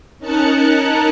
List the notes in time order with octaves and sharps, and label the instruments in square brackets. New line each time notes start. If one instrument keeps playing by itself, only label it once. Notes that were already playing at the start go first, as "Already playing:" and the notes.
[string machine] C#4 D#4 A#4 A5 F#6 C#7